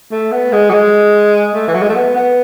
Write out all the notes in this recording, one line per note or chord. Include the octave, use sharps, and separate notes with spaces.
A3
B3
G#3
F#3
G#3
A3
E3
F#3
G#3
A3
B3
B3